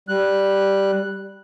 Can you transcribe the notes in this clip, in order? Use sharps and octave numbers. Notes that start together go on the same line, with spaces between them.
G3 F#6